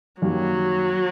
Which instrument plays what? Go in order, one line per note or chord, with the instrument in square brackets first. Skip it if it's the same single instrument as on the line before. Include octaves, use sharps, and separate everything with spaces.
[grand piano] F#2 D#3 G3 A#3 [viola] F#3